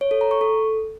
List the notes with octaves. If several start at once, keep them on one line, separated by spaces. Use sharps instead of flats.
C#5
A4
A#5
C#6
A4